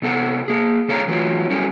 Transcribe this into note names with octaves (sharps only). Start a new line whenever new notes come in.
C3 B3 A4 F#5
A#3 G#4
C#3 A4 C#5 F5 A#5
E3 F#3 A3 E4 F4 C#5
F#3 G3 C#4 E4 A4